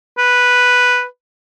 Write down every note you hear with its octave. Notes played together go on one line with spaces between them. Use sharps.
B4